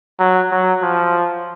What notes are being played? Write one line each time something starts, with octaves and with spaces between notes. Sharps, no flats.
F#3
F#3
F3